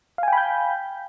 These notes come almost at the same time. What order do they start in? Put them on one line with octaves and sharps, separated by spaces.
F5 G#5 G5 B5 G6